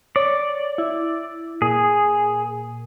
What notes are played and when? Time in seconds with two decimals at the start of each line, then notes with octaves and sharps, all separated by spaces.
0.16 C#5 D5
0.78 E4
1.62 A#2 G#4